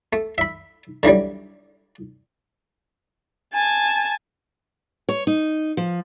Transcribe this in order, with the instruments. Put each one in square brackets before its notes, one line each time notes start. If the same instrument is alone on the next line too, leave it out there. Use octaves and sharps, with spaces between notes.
[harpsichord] A3
E5 B5
D3 E3 F#3 G3
[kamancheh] G#5 A5
[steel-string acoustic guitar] C#5
D#4
F3